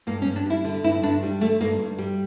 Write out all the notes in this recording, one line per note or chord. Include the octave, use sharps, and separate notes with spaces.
G2 A#3
C#4
G2
D4
G3 E4
D3
G2 E4
G2 D4
G3
D3 A3
G2 A#3
G2
G3